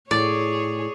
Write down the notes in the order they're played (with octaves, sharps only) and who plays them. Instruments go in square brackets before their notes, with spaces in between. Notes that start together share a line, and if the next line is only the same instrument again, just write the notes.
[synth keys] A2 [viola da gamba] G#4 C#5 [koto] D5